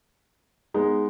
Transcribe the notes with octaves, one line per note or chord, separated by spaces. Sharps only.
G#3 B3 D#4